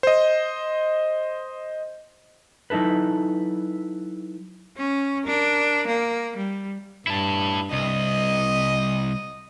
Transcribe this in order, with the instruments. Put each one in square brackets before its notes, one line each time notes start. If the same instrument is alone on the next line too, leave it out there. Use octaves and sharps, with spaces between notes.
[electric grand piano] C5 D#5
[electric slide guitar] F#3 D#4 E4 A4 B4
[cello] C#4
D4 A#4
A#3
G3
[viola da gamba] G2 [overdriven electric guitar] E4 A5
[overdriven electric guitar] C2 [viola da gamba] D#5